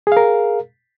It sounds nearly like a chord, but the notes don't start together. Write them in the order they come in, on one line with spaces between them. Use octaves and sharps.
G#4 F5 A#4